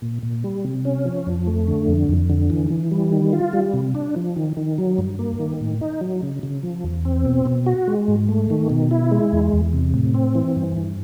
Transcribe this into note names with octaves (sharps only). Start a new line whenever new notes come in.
A#2
A#2
G3
C3
C#4
F3
F2
A3
D3
F2
F2
D3
E3
E3
G3
D#3
F4
G3
C3
D4
F3
D#3
D#3
F#3
G2
A#3
D#3
A2
D#4
F#3
C#3
C#3
F3
E2
C4
B2
B2
F#4
G#3
G#2
A3
D#3
B2
E4
G#3
E2
E2
C3
A2
C4
E3
G2
G2